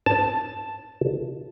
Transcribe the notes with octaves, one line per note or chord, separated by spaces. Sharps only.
A5